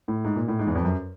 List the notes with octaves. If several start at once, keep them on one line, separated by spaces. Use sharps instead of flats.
A2
G#2
A#2
A2
G#2
E2
F2
F#2